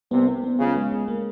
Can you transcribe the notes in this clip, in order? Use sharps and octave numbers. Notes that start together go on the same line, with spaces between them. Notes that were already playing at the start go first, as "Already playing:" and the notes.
C2 C3 B3
B3
B3
C#2 C#3 B3
G#3
G#3
A#3